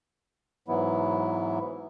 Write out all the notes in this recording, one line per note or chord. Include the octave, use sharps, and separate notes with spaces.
G#2 E3 F#3 B3 E4